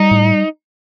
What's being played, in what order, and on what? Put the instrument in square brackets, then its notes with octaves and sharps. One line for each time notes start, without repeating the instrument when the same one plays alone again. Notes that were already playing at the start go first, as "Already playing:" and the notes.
Already playing: [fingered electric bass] G3 [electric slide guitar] D#4
[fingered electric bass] A2